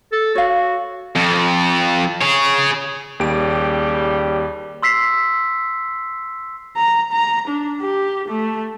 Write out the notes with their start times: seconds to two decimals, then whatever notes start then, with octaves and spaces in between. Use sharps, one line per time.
0.12 A4
0.35 F#4 C#5 F5
1.16 F2
2.22 G#4 C#5
3.20 D#2 C#3 G3 G4 D7
4.82 C6 E6 B6 C7
6.77 A#5
7.12 A#5
7.48 D4
7.81 G4
8.28 A3